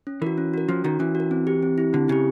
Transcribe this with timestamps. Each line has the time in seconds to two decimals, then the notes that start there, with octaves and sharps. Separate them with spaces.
0.07 C#4
0.22 E3 F#4 A#4
0.38 C#4
0.54 F#4 A#4
0.69 F3 C#4
0.84 D#3 F#4 A#4
0.99 E3 C#4
1.15 F#4
1.20 A#4
1.31 C4
1.47 E4 G4
1.63 C4
1.78 E4 G4
1.93 D3 C4
2.08 C#3 E4 G4